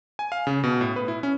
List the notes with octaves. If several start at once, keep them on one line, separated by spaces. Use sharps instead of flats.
G#5
F5
C#3
B2
A2
B4
E4
C#4